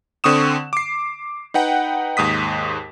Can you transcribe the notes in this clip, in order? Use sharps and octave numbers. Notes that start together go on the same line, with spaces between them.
D3 C4 C#6 D#6 E7
D6 C7
D#4 B4 F#5 G5
D#2 G#2 D#6 B6